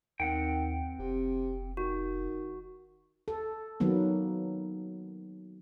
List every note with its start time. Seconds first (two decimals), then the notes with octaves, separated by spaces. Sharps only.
0.20 D#2 D#3 C4 F#5 G5
0.99 F1 C3
1.77 D#3 F#4
3.28 A4
3.80 D#3 F#3 A#3 B3